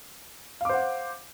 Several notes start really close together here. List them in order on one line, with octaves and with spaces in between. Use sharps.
F5 D6 C5 F#5